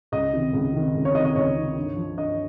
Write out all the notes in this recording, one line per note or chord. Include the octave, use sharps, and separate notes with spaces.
C#2 D#5
C3 D#3
C#2
C3 D#3
C#2
C#5
C3 D#3 D#5
D#5
C#2 C#5
C3 D#3
G2
F3
G2 D#5